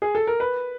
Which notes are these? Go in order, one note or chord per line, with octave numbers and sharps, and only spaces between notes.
G#4
A4
A#4
B4